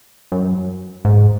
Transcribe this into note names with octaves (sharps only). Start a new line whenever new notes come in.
F#2
G#2